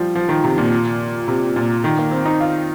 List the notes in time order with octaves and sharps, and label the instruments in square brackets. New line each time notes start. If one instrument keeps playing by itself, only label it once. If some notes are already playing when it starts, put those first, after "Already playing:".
Already playing: [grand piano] F3 G3
F3
D#3
C3
A#2
C3
A#2
D#3
A#3
C4
D#4
F4